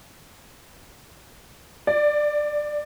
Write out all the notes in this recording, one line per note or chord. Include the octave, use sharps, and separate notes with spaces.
D5